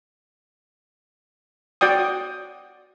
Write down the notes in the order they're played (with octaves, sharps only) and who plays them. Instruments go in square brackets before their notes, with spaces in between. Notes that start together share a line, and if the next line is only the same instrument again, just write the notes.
[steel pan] F#4 D5 G5 D#6